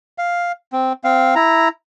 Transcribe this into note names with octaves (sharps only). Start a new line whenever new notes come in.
F5
C4
C4 F5
E4 A#5